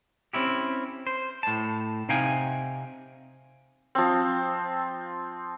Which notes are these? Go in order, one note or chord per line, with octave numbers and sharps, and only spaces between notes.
C4 C#4 E4 G4
C5
A2 A5
C3 D#4 F5 G5 G#5
F3 C4